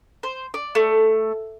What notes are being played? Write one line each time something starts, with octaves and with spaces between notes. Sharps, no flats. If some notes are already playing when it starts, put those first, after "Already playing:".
C5
D5
A3